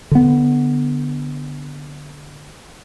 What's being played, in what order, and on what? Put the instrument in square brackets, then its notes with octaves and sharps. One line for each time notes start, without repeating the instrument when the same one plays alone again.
[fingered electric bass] D3 B3